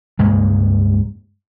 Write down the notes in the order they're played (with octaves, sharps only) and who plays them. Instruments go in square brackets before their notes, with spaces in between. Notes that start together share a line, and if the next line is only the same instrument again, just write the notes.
[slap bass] C#2 G2 G#3 A#3